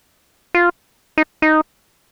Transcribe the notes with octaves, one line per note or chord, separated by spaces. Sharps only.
F4
D#4
D#4